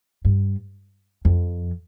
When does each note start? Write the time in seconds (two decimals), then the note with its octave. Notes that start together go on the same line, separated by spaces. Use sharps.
0.25 G2
1.25 F2